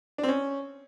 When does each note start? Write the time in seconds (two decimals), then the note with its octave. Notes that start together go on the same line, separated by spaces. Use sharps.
0.18 D4
0.23 C4
0.28 C#4